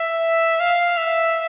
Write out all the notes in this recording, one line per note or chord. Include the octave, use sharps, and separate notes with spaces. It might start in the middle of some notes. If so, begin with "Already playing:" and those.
Already playing: E5
F5
E5